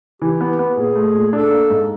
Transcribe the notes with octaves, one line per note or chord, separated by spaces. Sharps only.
E3 G4
B3
B3
A#2 G#4
A3
A#2
D4 A4
A#3
G#2